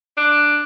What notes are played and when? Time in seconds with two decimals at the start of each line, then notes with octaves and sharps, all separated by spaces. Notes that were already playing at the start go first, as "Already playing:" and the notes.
0.18 D4